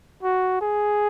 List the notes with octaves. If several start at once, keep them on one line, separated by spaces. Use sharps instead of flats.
F#4
G#4